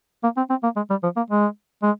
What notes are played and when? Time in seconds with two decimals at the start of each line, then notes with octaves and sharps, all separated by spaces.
0.24 A#3
0.37 C4
0.50 C4
0.63 A#3
0.76 G#3
0.90 G3
1.03 F3
1.17 A#3
1.30 G#3
1.83 G#3